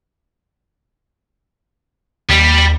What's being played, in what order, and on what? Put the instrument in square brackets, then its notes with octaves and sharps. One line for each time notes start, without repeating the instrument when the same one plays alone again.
[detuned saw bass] D#2 [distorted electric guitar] G3